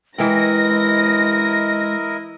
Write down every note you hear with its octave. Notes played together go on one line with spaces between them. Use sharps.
E3 G#3 E4 A#4 D#5 G5 A#6